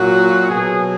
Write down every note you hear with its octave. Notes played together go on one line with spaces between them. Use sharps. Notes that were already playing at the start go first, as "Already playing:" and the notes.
Already playing: A#2 F#3 F#4
B2 F#3 G#4